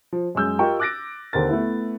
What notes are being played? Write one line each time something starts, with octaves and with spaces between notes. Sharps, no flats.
F3
F#2 G#3 E6 G6
F4 G4 A#4 D#5 G5 C#6
D6 F#6 A6 A#6 D7
D#2 D3 C4 A#4 A6
A3 B3 E4